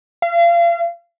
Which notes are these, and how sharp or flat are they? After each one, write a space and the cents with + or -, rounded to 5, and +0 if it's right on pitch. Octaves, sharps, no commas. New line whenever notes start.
F5 -35